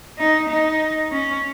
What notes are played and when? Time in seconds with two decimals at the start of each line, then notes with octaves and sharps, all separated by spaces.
0.18 D#4
0.48 D#4
1.12 C#4